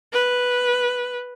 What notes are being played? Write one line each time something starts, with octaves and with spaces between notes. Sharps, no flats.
B4